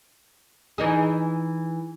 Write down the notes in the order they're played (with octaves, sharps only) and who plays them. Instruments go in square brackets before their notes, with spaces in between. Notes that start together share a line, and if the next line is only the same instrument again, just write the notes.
[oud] E3 D#4 G#4